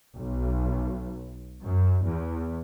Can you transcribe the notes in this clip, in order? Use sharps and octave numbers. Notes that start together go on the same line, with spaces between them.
B1
F#2
E2